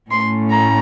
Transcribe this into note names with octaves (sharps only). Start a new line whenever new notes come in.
A2 A3 C#4 C6
A#5